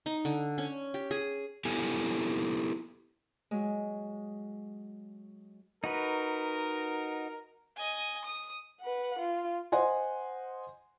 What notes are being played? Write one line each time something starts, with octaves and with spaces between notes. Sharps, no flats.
D#4
D3
C#4
G4
G#4
B3 E4 G4 A4 G#5
F#3 G#3
D#4 F#4 A#4 B4
D#5 G#5
D#6
B4 F#5
F4
C5 D#5 F#5 G#5 C6